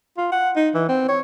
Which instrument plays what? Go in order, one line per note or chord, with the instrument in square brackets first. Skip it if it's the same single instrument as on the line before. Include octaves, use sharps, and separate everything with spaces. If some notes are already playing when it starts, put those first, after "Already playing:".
[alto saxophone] F4
F#5
D#4
E3
C4
C#5